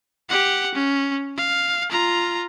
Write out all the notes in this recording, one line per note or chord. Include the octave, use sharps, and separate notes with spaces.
G4 F#5
C#4
F5
F4 A#5